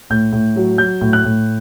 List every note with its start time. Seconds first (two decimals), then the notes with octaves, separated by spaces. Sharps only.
0.10 A2 G6
0.33 A2
0.56 F#3
0.78 F#3 G6
1.01 A2
1.13 F#6
1.24 A2